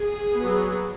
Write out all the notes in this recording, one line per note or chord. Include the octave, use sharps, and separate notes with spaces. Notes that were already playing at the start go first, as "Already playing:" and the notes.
Already playing: G#4
F#3 B3